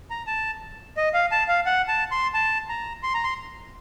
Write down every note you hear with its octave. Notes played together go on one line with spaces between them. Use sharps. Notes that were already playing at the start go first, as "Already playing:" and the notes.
A#5
A5
D#5
F5
A5
F5
F#5
A5
C6
A5
A#5
C6
A#5
C6